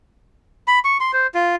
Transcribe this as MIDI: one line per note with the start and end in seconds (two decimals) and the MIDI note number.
0.68 0.79 83
0.85 0.97 85
1.00 1.11 84
1.13 1.27 72
1.34 1.56 65